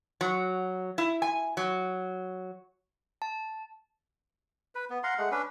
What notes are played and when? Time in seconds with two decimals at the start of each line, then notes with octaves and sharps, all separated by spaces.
0.21 F#3
0.98 E4
1.22 G#5
1.57 F#3
3.22 A5
4.75 B4
4.90 B3
5.03 F5 F#5 A#5 C6
5.18 G#3 A3 F#5
5.31 C#4 D4 B4